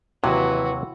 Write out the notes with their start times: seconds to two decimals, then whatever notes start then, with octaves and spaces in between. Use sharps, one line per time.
0.24 D#2 C3 E3 F#3 F#4